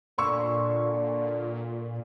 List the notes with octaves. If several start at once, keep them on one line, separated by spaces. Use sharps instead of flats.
A#2 D3 C6 C#6 E6